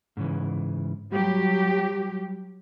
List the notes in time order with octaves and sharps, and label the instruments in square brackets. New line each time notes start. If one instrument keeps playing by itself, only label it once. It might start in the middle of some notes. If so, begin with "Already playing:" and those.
[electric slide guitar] G#2 C#3 E3
[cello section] F#3 G4 [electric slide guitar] G3